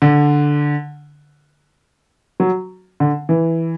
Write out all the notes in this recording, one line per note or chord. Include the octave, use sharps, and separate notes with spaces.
D3
F#3
D3
E3